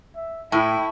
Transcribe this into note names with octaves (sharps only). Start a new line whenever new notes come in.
E5
A2 E4 G5 A5 C#6